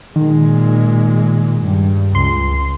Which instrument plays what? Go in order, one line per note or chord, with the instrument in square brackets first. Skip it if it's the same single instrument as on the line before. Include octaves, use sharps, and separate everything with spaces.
[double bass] A#2 G#3 [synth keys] D#3
[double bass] G2
[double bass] C#2 [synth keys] C6